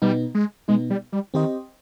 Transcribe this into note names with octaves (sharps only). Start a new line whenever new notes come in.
B2 G3 B3 D#4
G#3
B2 G#3 B3 D#4
G3
G3
D#3 C4 G4 C5 D#5